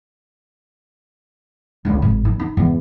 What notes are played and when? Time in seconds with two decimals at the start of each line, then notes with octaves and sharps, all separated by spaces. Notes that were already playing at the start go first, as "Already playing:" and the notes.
1.85 C#2 D3
2.02 G#1
2.25 D#3
2.40 D#4
2.57 E2 G#2